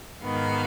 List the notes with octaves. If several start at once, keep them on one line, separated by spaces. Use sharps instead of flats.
G#2 D#3 B3 F5